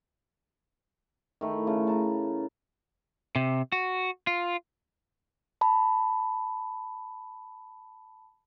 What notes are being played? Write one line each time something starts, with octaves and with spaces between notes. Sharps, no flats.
D#3 A3 E4
C#3 A3
A5 A#5
C3
F#4
F4
A5 B5